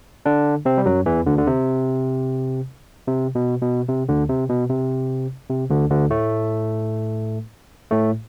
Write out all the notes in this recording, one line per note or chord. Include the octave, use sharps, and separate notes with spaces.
D3 D4
C3 C4
G3
F#2 F#3
E2 E3
D2 D3
D3
C3
C3
B2
B2
C3
D2 D3
C3
B2
C3
C3
D2 D3
D2 D3
A2 A3
A2 A3